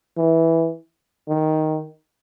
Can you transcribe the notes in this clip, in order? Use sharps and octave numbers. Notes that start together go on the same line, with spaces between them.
E3
D#3